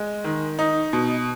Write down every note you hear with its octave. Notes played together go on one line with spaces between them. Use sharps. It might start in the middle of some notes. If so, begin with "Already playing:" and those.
Already playing: G#3
D#3
D#4
B2